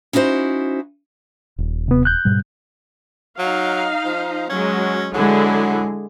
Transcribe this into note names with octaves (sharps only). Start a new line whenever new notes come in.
C#4 D#4 E4 F#4 C5
D#1
C3 B3
F#6 G6
G#2 B2 G3
F#3 D#4 F5
F3
F#3 G#3 C#4
D3 F#3 G#3 E4 G#4